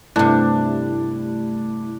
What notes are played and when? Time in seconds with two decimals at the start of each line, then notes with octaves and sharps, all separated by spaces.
0.16 G2 C3 A3 D4 E4